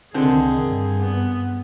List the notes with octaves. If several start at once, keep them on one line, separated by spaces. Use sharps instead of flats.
C2 D3 D#3 C4 G#4
G2
B3